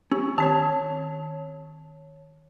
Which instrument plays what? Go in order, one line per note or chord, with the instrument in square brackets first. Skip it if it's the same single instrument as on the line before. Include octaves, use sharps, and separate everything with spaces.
[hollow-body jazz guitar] C#4 [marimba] G4
[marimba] D#3 C4 [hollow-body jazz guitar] C#5 A5